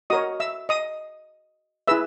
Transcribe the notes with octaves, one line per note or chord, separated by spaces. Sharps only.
F#4 A#4 C#5 D#5 D#6
E5 E6
D#5 D#6
E4 G#4 B4 E5 E6